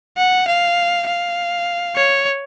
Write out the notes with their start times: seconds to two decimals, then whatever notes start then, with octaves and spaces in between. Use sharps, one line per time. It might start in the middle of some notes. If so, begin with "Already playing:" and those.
0.17 F#5
0.47 F5
1.07 F5
1.96 C#5